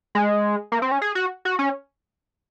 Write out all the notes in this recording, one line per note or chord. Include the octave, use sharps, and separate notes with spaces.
G#3
A#3
C4
C#4
G#4
F#4
F#4
C#4